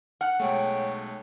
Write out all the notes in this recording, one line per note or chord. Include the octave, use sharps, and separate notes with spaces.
F#5 F6 F#6
B1 G#3 A3 C#5 G5